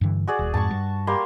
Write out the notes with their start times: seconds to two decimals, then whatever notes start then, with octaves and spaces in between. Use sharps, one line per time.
0.01 G2 D3 E3
0.27 F#4 G#4 D5
0.39 D#1
0.54 F2 G#2 A5 C#6
0.71 G2
1.07 G3 A#3 C6